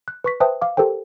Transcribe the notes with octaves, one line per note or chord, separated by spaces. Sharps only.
F#6
B4 C#6 B6
B4 C5 E5 G5 A5 D#6
F5 D6
G4 A4 A#4 C5 G5